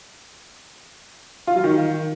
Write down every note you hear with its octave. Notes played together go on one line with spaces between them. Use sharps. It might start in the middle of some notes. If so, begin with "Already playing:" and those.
F4
F#3
D#3